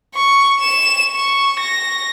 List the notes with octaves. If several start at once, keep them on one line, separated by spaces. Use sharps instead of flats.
C#6
E7
C#6
A#6